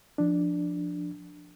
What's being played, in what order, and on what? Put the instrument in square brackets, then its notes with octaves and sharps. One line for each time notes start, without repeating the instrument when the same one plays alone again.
[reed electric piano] F3 D4